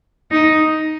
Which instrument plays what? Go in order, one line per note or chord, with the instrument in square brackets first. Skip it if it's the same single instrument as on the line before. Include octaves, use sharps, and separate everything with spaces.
[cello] D#4